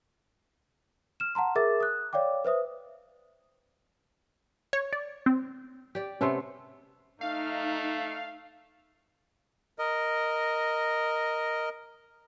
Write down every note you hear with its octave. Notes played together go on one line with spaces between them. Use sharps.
F6 E7
F#5 A5 A#5 C6
G#4 A#4 E5 D6 A6
D#6 F#6
C#5 D5 F5 G5 D6
B4 C5 E5 D#6
C#5
D5
C4
G4 D5
C3 A3 B3 C#4 C6
A3 D#4 F5
A#4 D#5